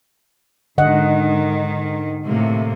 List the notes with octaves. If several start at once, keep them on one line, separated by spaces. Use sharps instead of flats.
G#2 D3 D#3 D#5 F#5
A2 C3 A#3